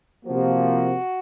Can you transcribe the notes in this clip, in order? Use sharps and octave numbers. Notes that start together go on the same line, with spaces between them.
C3 F3 A#3 F#4